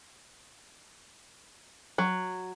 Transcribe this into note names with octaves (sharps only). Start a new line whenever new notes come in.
F#3